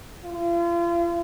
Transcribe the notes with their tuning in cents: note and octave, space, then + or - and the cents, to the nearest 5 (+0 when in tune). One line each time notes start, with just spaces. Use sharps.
F4 -40